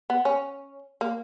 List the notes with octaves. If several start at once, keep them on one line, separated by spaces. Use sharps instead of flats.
B3
C#4
A#3